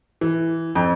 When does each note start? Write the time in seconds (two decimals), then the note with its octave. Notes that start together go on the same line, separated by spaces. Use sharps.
0.21 E3
0.75 F2